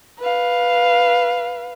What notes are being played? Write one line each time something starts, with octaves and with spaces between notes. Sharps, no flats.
B4 F5